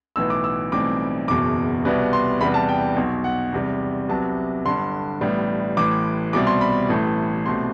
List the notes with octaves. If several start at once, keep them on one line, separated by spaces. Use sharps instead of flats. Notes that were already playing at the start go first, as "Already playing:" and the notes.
B1 A2 E3 B3 E6
D6
E6
B1 A2 E3 G3 C4 D6
F#1 E2 B2 D6
C2 B2 G3 B3
C6
E2 C3 G3 B3 B5
A5
G5
B1 B2 F#3
F#5
E2 C3 G3
C2 C3 F#3 B3 A5
G1 G2 D3 C6
A1 A2 G3 B3
A1 A2 E3 D6
C2 B2 G3 C4 D6
C6
B5
A1 A2 E3 A3
C2 B2 A3 C4 C6